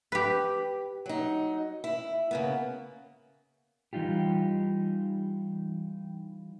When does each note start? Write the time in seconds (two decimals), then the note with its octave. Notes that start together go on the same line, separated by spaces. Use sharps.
0.12 G4 B4
1.06 F#3 D#4
1.84 E4
2.31 C#3 A#3 B3
3.93 E3 G3 D#4 F4 G4